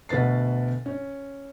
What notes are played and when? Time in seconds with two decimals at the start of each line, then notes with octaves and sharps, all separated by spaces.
0.09 D2 B2 B4 A6 C7
0.86 C#4